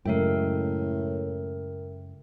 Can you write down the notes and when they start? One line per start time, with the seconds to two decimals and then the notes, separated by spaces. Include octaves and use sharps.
0.05 F#2 A2 C#3 G#3 A3 A#4 E5 G5